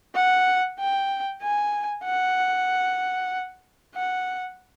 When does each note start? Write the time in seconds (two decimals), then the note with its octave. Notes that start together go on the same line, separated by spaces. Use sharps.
0.15 F#5
0.79 G5
1.42 G#5
2.05 F#5
3.95 F#5